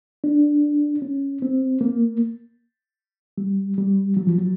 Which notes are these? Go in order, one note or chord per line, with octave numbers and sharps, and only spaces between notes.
D4
C#4
C4
A#3
G3
G3
F#3
F3
F#3